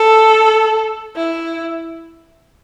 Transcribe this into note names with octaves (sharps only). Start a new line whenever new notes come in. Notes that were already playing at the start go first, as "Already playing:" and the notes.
Already playing: A4
E4